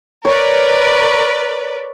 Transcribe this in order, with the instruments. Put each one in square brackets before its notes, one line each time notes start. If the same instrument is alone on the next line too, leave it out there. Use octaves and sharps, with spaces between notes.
[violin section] A#4 B4 D5 [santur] C#5